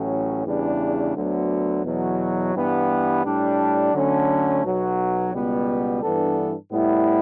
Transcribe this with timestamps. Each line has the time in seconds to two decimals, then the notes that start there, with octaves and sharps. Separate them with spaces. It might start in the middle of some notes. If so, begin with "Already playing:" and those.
Already playing: A1 A2 F#3 C#4
0.45 E2 C#3 E3 G3 D4
1.15 D2 D3 F#3 B3
1.85 E2 B2 F#3
2.55 G2 E3 G3 B3
3.24 A2 G3 D4
3.94 D3 F#3 A3 C#4
4.64 B1 B2 F#3
5.33 C#2 B2 G3 B3
6.02 G2 E3 B3 D4 A4
6.71 A2 G3 B3 E4